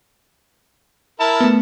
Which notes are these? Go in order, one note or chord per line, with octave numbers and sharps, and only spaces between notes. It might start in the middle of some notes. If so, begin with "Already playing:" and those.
E4 A#4 A5
A3 B3